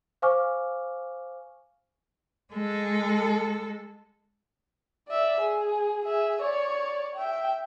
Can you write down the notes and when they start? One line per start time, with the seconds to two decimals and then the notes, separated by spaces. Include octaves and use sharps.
0.22 C5 F5 G#5 C#6 D6 F6
2.53 G#3 A4
5.08 D5 E5
5.40 G#4
6.05 G#4 E5
6.41 C#5 D5
7.16 E5 G5